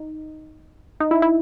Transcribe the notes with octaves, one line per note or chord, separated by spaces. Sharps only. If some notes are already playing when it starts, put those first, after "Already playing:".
Already playing: D#4
D#4
E4
E4